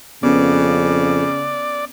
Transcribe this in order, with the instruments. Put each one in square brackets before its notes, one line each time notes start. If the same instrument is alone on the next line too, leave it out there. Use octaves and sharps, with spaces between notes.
[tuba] F2 [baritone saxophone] C#3 [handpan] B3 C#4 [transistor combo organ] D5